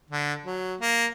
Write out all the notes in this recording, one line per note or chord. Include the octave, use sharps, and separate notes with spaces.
D3
F#3
A#3